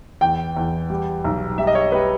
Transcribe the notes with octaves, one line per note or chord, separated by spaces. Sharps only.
E2 G5
E2
G3
B1
G3 E5
D#5
C#5
G3 B4